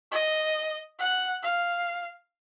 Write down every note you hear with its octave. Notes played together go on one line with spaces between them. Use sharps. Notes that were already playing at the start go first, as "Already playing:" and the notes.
D#5
F#5
F5